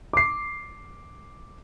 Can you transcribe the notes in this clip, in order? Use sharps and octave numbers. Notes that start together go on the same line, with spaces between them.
D6 C7